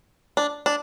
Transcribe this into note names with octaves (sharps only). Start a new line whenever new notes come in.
D4
D4